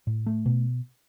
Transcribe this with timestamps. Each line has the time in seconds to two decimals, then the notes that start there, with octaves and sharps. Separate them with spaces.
0.07 A2
0.26 A3
0.46 B2